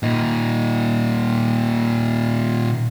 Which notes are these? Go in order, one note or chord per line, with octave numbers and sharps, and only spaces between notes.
A#2 D#4